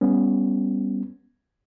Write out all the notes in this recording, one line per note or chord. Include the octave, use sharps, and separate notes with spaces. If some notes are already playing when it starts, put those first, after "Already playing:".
G3 B3 C#4